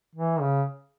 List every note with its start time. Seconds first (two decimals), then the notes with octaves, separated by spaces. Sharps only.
0.15 E3
0.41 C#3